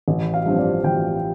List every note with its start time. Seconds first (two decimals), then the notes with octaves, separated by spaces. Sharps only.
0.08 A1
0.34 F5
0.46 G2 F3 C4
0.58 D5
0.84 A1 G5